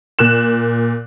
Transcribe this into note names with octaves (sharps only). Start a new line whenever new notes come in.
A#2 F#6 E7